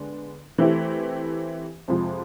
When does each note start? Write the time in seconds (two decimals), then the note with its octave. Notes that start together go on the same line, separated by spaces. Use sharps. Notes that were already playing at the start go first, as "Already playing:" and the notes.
Already playing: D3 G#3 B3 D4
0.58 E3 A3 C4 E4 G4
1.88 F2 C3 F3 G#3